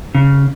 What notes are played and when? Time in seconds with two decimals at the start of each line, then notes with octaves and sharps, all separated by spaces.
0.15 C#3